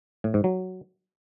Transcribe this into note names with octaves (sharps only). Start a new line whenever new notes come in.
A2
G#2
F#3